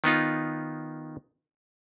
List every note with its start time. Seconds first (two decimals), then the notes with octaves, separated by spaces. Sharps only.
0.04 D#3 B3 D#4 F4